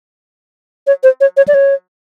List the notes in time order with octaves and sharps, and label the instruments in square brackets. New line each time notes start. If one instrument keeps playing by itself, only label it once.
[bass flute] C#5
C5
C#5
C#5
D5
C#5